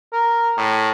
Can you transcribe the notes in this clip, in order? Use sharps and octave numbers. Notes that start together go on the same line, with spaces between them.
A#4
A2